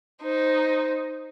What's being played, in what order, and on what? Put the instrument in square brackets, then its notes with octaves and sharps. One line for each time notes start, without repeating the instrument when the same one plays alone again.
[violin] D#4 C5